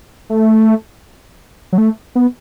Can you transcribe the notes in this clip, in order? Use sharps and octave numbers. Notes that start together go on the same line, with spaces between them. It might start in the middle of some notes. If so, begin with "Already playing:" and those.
A3
F#3
A3
B3